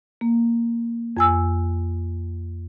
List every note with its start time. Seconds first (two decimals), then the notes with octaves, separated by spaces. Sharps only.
0.21 A#3
1.17 F2 G#5 E6